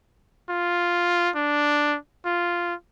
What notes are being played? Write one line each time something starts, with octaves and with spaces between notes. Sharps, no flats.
F4
D4
F4